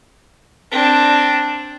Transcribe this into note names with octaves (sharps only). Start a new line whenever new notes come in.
C4 D4